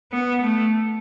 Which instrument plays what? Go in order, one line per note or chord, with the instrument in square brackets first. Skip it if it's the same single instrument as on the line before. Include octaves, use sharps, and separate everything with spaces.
[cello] B3
A3